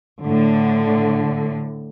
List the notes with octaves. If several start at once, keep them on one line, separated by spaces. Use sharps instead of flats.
A2 D3